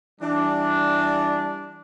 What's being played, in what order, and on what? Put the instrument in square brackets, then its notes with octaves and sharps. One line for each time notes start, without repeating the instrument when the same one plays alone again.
[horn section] E3 G3 D4